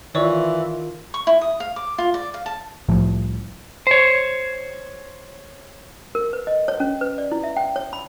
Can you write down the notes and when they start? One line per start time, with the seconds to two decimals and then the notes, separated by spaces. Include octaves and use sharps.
0.15 D#3 E3 F4 C#5 D5 C#6
1.14 C#6
1.27 E4
1.41 D#6
1.60 F5
1.76 D6
1.98 F4
2.14 D5
2.34 F5
2.46 A5
2.88 C2 A2 F3
3.87 C5 C#5
6.15 A#4
6.33 B4
6.47 D#5
6.68 C#5
6.80 C#4
7.01 B4
7.18 D5
7.32 E4
7.44 E5
7.57 G5
7.76 C#5
7.93 B5